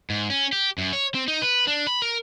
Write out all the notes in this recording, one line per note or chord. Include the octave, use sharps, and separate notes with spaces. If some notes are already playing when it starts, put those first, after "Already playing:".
G#2
C#4
G4
F#2
C#5
C4
D#4
B4
D4
B5
A#4